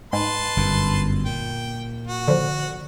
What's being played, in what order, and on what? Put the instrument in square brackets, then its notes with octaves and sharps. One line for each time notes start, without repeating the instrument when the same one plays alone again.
[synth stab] G#2 [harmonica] B4 A5 C6
[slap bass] G1 F#2
[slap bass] A#2 [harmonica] G5
[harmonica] F#4
[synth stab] D3 F3